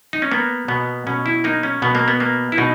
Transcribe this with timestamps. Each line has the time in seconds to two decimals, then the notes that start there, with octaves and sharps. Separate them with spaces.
0.13 D#4
0.22 C#4
0.32 A#3 B3
0.68 B2 B3
1.07 B2 C#4
1.26 E4
1.44 A#3 D#4
1.63 C#4
1.82 B2 B3
1.95 A#3
2.08 B3
2.20 A#3
2.52 E4
2.58 B2 D#4